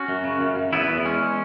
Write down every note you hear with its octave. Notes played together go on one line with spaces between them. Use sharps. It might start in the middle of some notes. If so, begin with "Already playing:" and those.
Already playing: C#4 F#4
F#2
C#3
F#2
F#2
E2 B3 E4
E2
G#3 C#4